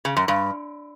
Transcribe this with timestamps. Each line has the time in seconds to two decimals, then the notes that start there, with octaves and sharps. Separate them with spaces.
0.05 C#3
0.17 F#2
0.28 G2